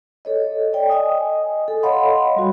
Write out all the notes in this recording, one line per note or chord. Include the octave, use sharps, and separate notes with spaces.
A4 C#5 D#5
D5 G5
D#5 G#5 D#6
A4
C#5 D#5 F5 F#5 B5 C6
G3 F#4